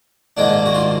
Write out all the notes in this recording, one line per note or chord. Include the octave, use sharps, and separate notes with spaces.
G#2 D#3 A#3 D4
F#4
F4